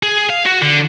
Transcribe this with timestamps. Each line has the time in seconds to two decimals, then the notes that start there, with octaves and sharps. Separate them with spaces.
0.03 G#4
0.30 F5
0.46 F#4
0.62 D3